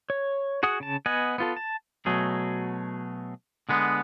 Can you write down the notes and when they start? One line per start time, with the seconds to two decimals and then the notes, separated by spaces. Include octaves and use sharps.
0.10 C#5
0.63 F#4 G#4 F#5 D#6
0.80 C#3 A5
1.06 B3 D#5 F#5 G#5
1.38 B3 F4 A4
1.56 A5
2.06 B2 F#3 A3 G#4
3.69 D3 G#3 B3